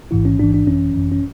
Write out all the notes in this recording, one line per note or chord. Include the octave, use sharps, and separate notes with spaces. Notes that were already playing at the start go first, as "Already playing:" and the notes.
A1 G#2 E3 E4
C#4
A1 G#2 E3 D4
D4
G#1 F#2 E3 C#4
G#1 F#2 E3
C#4